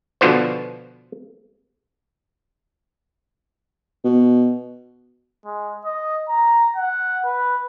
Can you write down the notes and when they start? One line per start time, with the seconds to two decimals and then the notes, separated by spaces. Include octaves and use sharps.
0.21 B2 D3 F3 B3 C5
4.04 B2
5.45 G#3
5.85 D#5
6.29 A#5
6.76 F#5
7.25 B4